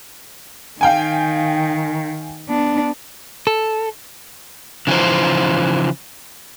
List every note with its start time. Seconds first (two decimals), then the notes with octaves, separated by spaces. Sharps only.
0.81 D#3 F5 G5 G#5
2.49 B3 D4
3.47 A4
4.87 C#3 E3 F3 D#4 C5